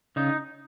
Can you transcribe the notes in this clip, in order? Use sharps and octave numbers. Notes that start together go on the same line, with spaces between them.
C#3 D#4